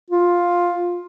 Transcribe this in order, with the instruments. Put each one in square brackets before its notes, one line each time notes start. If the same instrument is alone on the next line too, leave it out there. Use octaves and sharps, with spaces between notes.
[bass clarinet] F4